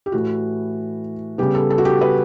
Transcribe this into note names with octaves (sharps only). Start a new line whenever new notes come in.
G4
A2 E3 A3 F#4
C#3 G3 B3 G4
A4
A4
F#4
G4
B4